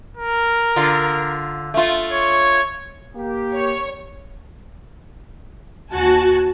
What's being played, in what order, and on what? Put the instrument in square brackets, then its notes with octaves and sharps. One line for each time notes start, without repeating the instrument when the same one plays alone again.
[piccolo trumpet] A#4
[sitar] D3 F4
A3 F4
[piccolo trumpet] C#5
[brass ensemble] A#3 G4
[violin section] C#5
[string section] D#2 F#4 G#5 A5